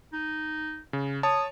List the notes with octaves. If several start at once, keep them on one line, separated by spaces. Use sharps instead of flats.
D#4
C#3
C#5 A5 D#6